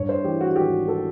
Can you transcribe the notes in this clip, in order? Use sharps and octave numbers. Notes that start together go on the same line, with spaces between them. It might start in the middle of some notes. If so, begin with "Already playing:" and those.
Already playing: G2 C#5
C5
E3 G4
F#4
F#4
G#1 G4
A4